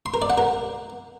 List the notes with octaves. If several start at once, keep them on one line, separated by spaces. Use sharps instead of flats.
C6
A#4
D5
F#5
A#4